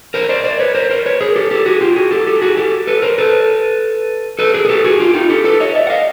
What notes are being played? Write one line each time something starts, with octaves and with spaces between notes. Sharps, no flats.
A#4 C5
C5 D5
C5 D5
B4 C#5
A#4 C5
A#4 C5
B4 C#5
G#4 A#4
G4 A4
G4 A4
F#4 G#4
F4 G4
F#4 G#4
G4 A4
G4 A4
F#4 G#4
G4 A4
A4 B4
A#4 C5
A4 B4
A4 B4
G#4 A#4
G#4
G4 A4
F#4 G#4
F4 G4
D#4 F4
G4 A4
A4 B4
C#5 D#5
D5 E5
F#5
D#5 F5